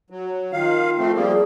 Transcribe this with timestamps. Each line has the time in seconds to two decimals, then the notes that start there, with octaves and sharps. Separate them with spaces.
0.10 F#3
0.52 D#3 F4 F5
0.98 F3 A3 C4
1.15 F3 G3 A#3 G#4